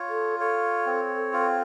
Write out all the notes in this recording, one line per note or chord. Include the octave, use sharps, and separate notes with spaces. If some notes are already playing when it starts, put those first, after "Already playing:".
Already playing: F4 C#5
A4
A4 C#5
C4
F4